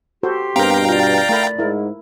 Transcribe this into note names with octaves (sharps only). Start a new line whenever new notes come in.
F#4 G4 A4 C5 C6
G2 B2 C4 A#4 F5 G5 A#5
F4 D5
A3 A#4 B5
G#2 E4 A#4